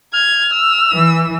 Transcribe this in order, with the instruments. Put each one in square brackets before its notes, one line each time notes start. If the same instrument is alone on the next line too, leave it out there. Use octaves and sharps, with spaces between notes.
[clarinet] F6 [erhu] G#6
[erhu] E6
[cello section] E3